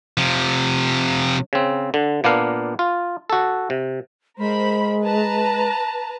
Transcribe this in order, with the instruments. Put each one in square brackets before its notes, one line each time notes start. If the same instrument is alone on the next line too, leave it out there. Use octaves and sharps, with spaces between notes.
[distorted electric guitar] C3 F3
[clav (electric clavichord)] C#3 C4
D3
A#2 A#3 B3 D4 F5
F4
F#4 A4
C3
[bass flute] G#3 [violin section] A#4 C5 B5
[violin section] B4 A5 A#5